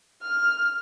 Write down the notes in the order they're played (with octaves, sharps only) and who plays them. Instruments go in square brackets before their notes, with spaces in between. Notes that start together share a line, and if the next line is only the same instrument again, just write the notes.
[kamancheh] F6